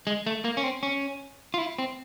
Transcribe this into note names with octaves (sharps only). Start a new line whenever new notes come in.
G#3
A3
A#3
C#4
C4
C#4
F4
E4
C4